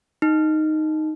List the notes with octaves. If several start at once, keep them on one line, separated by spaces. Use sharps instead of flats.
D#4